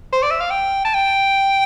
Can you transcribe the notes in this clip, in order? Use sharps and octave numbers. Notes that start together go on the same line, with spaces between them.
C5
D5
E5
F5
G5
A5
G5